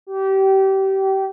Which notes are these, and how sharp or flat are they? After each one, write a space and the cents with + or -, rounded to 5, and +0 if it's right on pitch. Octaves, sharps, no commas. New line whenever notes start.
G4 -25